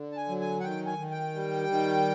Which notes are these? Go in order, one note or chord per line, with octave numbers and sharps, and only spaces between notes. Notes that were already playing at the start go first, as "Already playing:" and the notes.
Already playing: D3
A5
G#5
F#3
G#5
F#5
D#3 G5
G#5
D#3
G5
G3
D#3